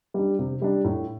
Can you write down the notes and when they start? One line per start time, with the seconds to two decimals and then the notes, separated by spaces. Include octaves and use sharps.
0.14 G3 D4
0.39 C3
0.62 G3 D4
0.84 A2